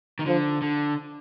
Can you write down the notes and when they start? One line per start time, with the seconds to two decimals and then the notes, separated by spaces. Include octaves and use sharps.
0.19 D#3
0.26 D3 F3
0.62 D3